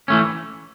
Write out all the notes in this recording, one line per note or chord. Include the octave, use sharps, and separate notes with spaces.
E3 A3 C#4